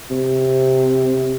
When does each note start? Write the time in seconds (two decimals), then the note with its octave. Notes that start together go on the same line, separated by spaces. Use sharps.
0.11 C3